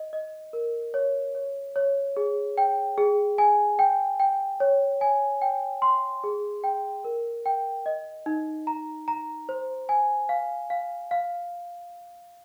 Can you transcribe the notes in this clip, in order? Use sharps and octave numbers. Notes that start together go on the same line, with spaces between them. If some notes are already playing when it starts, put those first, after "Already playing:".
Already playing: D#5
D#5
A#4
C#5
C#5
C#5
G#4
G5
G#4
G#5
G5
G5
C#5
G#5
G5
C6
G#4
G5
A#4
G5
D#5
D#4
A#5
A#5
C5
G#5
F5
F5
F5